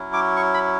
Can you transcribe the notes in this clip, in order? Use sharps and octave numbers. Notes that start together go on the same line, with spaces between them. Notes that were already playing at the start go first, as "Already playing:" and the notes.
Already playing: F#3 C#4 E4
D6
C#6
B5